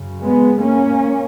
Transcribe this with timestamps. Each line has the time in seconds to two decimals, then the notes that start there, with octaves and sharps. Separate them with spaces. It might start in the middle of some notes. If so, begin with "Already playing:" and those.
Already playing: F#2 C#3
0.23 G#3 B3
0.61 A#3 C#4